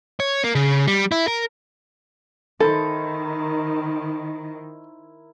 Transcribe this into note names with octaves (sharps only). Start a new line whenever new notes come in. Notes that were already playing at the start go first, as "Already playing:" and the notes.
C#5
A#3
C#3
G3
E4
A#4
D#3 E4 A4 A#4 C5